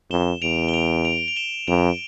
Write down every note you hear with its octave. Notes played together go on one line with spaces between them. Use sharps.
F2 E7 G7
E2 D7 F7
G7
D7 F7
D7 F7
F7
E7 G7
F2 D7 F7